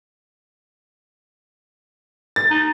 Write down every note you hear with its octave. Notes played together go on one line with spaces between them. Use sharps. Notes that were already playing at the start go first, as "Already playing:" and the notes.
A6
D#4